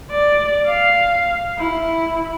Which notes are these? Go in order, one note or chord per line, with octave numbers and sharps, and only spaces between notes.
D5
F5
E4